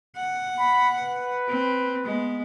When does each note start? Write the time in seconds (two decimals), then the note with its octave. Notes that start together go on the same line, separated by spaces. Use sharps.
0.16 F#5
0.60 B5
0.98 B4
1.48 C4
2.05 G#3 B3